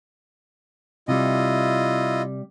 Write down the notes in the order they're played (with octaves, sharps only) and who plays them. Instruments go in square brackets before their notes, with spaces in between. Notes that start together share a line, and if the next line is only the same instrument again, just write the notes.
[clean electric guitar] C3 G3 [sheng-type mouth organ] E4 F4 D#5